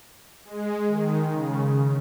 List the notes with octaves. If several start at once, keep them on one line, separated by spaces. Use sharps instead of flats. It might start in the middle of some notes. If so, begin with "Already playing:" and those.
G#3
D#3
C#3